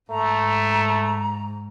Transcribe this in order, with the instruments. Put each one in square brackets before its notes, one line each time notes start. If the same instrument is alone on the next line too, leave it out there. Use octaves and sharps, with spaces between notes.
[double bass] G#2 [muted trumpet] A3 [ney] A#5